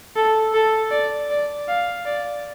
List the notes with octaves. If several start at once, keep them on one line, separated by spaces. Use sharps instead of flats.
A4
A4
D5
D5
F5
D5